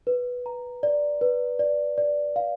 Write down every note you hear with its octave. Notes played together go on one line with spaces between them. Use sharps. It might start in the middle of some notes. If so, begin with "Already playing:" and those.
B4
A#5
D5
B4
D5
D5
F5